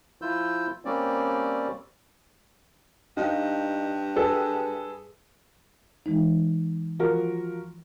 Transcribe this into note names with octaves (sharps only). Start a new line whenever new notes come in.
F3 E4 F4 E6 G6
G3 A#3 C4 C#4 D5
G2 D#4 F5
G#4 A4 B4
E3 G#3 D#4
F3 F#4 A#4